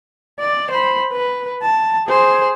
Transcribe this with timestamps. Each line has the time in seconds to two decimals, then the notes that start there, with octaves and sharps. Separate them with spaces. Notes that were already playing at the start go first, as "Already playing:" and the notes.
0.40 D5
0.71 C5 B5
1.12 B4
1.63 A5
2.08 G#4 C5